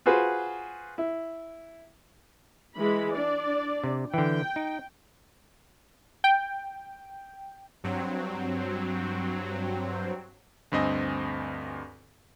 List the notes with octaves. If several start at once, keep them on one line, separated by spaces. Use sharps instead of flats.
F4 F#4 G#4 B4 C5
E4
E3 G#3 B5
D4 D5
C3
D3 E3 G5
D#4
G5
G2 F#3 C4
D2 G2 C4 D#5 G#5